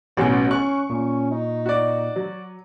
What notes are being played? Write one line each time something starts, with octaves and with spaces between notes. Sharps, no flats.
A1 B2 F#3 B3 C#4 G#4
C#4 C#6 F#6
A#2 C#4
D#4
F#4 D5
F#3